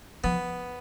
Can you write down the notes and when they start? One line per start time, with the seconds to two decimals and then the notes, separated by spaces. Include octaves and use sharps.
0.24 F3 B3